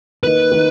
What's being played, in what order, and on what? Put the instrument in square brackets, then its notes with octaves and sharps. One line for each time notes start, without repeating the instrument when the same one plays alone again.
[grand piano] D#3 A#3 D#4 [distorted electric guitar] B4
[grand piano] D#3 A#3 D#4